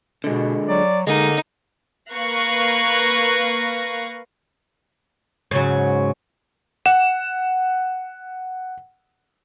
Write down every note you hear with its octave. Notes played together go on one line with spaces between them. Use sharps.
B2 D3 G#3
F#3 D5
D3 G#3 A#3 D#4
A#3 B4 F5 C#6 F#6 A#6
G#2 C#3 F#3
F#5 E7